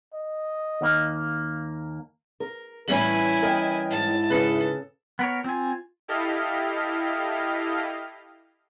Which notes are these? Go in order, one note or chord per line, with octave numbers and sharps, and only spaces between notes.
D#5
D#2 A#3
A#4
A2 E3 G3 C#4 E4 G#5 F#7
A#4 D#5 G5
G#2 E4 A5
C#3 A4 B4
B3 A#4 C#5
C4 F4 G#5
E4 G4 A4 D#5 F5